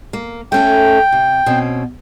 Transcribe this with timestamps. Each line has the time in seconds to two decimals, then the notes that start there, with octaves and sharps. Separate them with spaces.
0.13 A#3
0.52 A3 C#4 A4 G5
1.12 C3
1.46 B2 C4 C#4